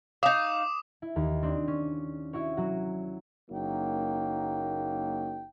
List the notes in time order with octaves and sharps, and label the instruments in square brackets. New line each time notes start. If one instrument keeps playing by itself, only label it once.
[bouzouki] D#4 F5 [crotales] D6 D#6 E7
[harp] E4
D#2
C4 D4
C#4
E4 F#4 C#5
F#3 F#4
[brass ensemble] F#1 F#3 A#3 D#4 G5